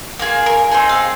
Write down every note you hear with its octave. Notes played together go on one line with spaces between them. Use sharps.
A#3 F4 G#4
A#4
C4 D#4 G#4
F5